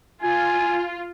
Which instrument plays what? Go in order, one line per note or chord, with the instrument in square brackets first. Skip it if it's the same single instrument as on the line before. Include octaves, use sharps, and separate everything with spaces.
[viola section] F4 [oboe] G#5